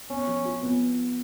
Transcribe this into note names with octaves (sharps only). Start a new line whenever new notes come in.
B3 C#4
F3
F4
B3